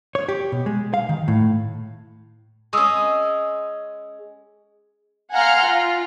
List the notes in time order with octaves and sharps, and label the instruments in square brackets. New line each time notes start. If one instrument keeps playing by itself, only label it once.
[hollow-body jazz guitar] C#5
G4
B2
G#3
F5
D#3
A2
[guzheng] G#3 C#4 [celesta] C#6 D#6 E6
[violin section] F5 F#5 G#5 A#5 C6 F6
F4